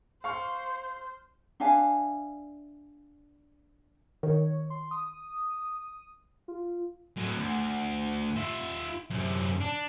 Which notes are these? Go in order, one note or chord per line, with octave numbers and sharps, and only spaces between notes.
C5 F5 C#6 F6
D4 E5 F5 G#5
D#3 C#5
C6
D#6
F4
A2 F#3
D2
F4 E5
F#2 C3
D4